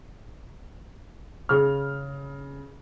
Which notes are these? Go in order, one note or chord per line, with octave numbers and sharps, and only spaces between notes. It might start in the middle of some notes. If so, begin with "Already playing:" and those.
C#3 F6